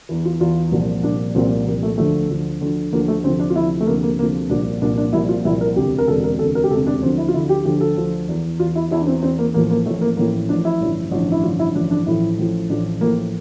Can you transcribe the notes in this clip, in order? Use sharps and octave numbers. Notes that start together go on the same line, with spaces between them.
E2 E3
F4
E2 E3 F4
C2 A#2 F3
C2 A#2 F3 D4
C2 A#2 F3 C4
C2 A#2 F3 A#3
A3
D2 D3 F3 A3
D2 D3 F3
D2 D3 F3
D2 D3 F3 A#3
A3
D2 C3 F3 C4
D4
F4
D2 C3 F3 E4
A3
D2 C3 F3 A#3
A#3
D2 C3 F3 A#3
C2 A#2 F3 D4
C2 A#2 F3 D4
D4
C2 A#2 F3 E4
F4
C2 A#2 F3 E4
A#4
E1 D2 C3 G4
A#4
E1 D2 C3 A4
A#4
E1 D2 C3 A4
A#4
G4
E1 D2 C3 A4
D4
D2 D3 F3 C4
E4
F4
D2 D3 F3 E4
G4
D2 D3 F3 G4
A4
D2 D3 F3
E2 E3
E2 E3 F4
E4
E2 E3 E4
D4
C4
E2 E3 C4
A#3
A1 A2 F3 A#3
A#3
A1 A2 F3 A3
A#3
A1 A2 F3 A#3
A1 A2 F3 D4
E4
A1 G2 D3 F3
A1 G2 D3 F3
E4
A1 G2 D3 F3 F4
E4
A1 G2 D3 F3 D4
D4
A1 A2 F3 E4
A1 A2 F3
A1 A2 F3 D4
A1 A2 F3 A#3